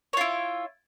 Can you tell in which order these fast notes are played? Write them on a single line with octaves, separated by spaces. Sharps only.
C#5 F4 E4